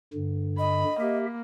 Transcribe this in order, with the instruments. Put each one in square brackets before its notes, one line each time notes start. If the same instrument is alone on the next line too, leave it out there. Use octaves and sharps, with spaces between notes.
[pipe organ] G2 D3
[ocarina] D#5 [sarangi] B5
[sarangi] A#3 [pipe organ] G4 E5